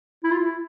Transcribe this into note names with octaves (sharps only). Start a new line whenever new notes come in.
E4
F4
E4